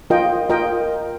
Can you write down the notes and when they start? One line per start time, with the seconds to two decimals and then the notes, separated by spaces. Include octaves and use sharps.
0.10 F4 A#4 D#5 G5
0.49 F4 A#4 D#5 G5